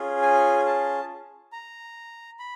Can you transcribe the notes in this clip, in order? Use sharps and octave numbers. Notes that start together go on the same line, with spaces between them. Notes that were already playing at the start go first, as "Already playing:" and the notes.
Already playing: C#4 F4 G#4
G#5
A5
A#5
B5